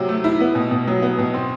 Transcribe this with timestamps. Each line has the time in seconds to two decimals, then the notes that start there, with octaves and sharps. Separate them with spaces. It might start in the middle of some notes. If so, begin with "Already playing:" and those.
Already playing: C3 F#3
0.09 A3
0.24 E4
0.40 B3
0.55 B2
0.71 B2
0.88 F#3
1.02 B3
1.18 B2
1.34 C4